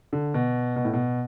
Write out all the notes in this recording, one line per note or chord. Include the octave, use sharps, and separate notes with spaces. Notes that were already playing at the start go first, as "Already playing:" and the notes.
D3
B2
B2
A2
B2